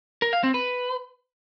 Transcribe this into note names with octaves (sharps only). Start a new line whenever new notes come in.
A#4
F5
C4
B4